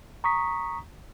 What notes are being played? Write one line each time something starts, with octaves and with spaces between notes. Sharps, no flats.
A#5 C#6 D#6 B6